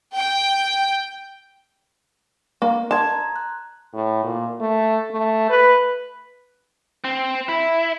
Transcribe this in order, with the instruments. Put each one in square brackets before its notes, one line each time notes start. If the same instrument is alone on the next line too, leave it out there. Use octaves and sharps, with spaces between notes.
[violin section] G5
[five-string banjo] A#3
[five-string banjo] A5 [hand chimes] C6 D#6 G#6
[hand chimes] A#5
F#6
[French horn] A2
A#2
A3
A3
B4
[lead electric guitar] C4
E4